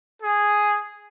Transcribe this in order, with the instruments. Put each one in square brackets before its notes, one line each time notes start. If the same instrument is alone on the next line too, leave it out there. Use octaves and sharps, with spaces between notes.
[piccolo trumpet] G#4